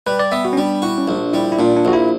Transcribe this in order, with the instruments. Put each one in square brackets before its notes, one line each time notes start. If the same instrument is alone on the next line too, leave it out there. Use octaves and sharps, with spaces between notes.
[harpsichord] G3 [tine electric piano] B4
[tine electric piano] D5
[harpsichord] B3 [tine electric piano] E5
[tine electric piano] F#4
C#4
[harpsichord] G3 [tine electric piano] D4
[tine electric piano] E4 [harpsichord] F#4
[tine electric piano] C#4
[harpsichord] A#1 [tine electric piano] D4
[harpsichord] G3 [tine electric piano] E4
[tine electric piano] E4
[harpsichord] A#2 [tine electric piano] D4
[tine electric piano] D4
[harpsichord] A#1 [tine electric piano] F#4
[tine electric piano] E4